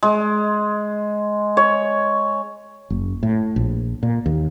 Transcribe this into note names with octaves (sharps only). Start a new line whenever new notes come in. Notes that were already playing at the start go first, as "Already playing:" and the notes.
G#3
C#5
F#1
A2
A#1
A#2
D#2